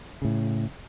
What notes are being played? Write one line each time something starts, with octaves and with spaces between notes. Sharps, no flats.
A2 C#3